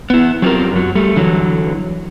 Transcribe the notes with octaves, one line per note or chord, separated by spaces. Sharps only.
B3 E4
F#3 C4 F4 G4 A#4
F#2 F#3
G3 A3
D3 E3 F#3